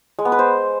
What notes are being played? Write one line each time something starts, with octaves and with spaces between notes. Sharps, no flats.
G#3
B3
B4
C5